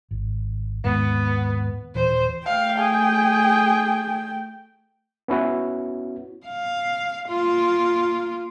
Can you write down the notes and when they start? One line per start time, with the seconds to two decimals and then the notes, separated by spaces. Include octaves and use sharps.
0.11 G#1
0.84 D#2 G#2 B3
1.95 D#1 E3 C5
2.46 A3 F5 G5
2.78 G#4
5.28 B3 C#4 E4 F#4
6.46 F5
7.29 A#3 F4